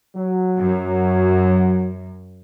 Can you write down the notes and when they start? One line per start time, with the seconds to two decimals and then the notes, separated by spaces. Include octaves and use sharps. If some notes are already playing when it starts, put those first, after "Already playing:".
0.16 F#3
0.59 F#2